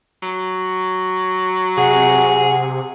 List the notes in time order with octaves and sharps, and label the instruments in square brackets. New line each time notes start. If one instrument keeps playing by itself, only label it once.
[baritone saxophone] F#3
[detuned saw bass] C3 [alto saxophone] G#4 [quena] F#5